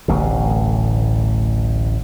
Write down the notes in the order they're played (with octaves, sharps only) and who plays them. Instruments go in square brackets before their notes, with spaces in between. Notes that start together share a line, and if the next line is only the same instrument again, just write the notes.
[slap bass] D1 A1 B2